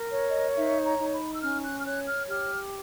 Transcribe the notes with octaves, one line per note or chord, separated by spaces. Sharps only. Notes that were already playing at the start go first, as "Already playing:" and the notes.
Already playing: A#4
C#5
D#5
D#4 E5
A#5
D#4
B5
E6
C#4 F6
F#6
F6
C#5 F#6
F6
G4 F6